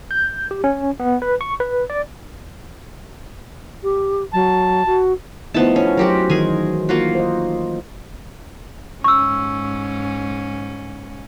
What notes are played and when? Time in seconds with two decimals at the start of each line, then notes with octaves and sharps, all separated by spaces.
0.11 G6
0.51 G4
0.64 C#4
1.00 B3
1.22 B4
1.41 C#6
1.60 B4
1.90 D5
3.83 G4
4.33 F#3 A5
4.86 F#4
5.54 F3 A3 B3 D#4 E4 A5
5.76 C#4
5.97 F#3 F#4 G4 A#4 C5
6.30 D#3 E3 D#4 G#4 A#4 G#5
6.89 A#3 F4 F#4
7.15 C5 D#5
9.04 G#2 C#4 C#6 E6